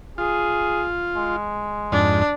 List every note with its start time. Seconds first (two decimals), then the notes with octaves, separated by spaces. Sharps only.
0.18 F4 G#4
1.16 G#3
1.92 F2 G#2 D4